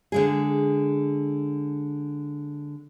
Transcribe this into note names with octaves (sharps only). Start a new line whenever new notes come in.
D3 G#3 G#4